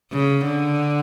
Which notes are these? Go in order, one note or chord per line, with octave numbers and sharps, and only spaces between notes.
C#3
D3